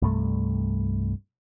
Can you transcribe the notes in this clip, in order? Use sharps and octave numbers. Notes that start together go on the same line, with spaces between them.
C2 G2 A3